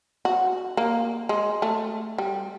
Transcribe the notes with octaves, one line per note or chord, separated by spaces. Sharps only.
F#4
A#3
G#3
A3
G3